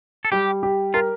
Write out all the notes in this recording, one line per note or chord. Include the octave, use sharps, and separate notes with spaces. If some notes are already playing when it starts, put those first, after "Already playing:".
A4
G3 G4
G4
F4 A#4